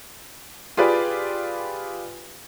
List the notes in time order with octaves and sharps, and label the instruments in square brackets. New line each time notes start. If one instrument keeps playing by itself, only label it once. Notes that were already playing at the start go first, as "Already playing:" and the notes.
[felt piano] F4 G4 G#4 B4 D5